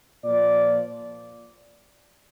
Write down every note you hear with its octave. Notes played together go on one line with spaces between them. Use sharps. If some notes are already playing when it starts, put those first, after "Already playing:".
A#2 F3 D5